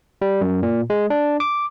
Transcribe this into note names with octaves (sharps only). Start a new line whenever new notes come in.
G3
F#2
A#2
G#3
D4
D6